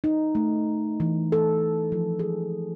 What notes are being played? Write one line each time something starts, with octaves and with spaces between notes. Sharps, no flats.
D#4
A3
E3
A4
F3
G#4